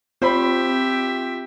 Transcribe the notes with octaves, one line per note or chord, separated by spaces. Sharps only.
C4 F4 G4 C5 E5 B5